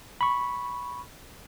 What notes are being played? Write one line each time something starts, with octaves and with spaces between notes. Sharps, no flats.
B5 C#6